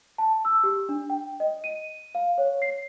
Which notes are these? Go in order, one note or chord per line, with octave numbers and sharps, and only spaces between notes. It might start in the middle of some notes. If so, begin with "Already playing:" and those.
A5
E6
G4
D4
G5
D#5
D#7
F5
C#5
C7